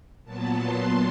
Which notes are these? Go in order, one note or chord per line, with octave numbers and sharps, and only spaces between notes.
A#2 F#3 B3 A5
C6